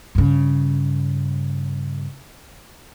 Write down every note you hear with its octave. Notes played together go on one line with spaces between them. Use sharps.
G2 C#3